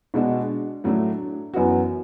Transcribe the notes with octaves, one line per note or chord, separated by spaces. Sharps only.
B2 G#3 D4 F#4
A2 F#3 A3 D4
F#2 E3 B3 F#4